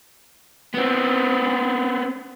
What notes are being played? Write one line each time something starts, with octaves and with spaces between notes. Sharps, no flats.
B3 C4